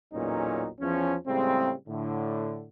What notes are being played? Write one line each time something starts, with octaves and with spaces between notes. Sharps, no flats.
A1 E2 A#2 F#3 C#4 D#4
E2 F3 C#4
A2 C#3 G3 G#3 C4
A2 D3